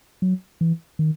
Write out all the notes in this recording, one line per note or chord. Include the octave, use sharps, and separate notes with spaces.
F#3
E3
D#3